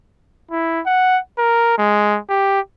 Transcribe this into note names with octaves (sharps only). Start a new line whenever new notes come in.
E4
F#5
A#4
G#3
G4